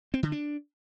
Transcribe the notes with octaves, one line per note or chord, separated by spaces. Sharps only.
C4
D3
D4